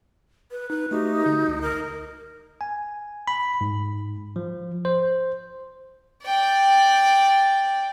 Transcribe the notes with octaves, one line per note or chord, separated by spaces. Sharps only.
B4
D#4 B4
A3 D#4 F#4 G4
D3
C#2
A#4
G#5
B5
G#2
F3
C5
D5 G5